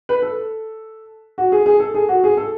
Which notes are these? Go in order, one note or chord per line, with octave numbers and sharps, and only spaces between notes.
B4
A4
F#4
G#4
G#4
A4
G#4
F#4
G#4
A4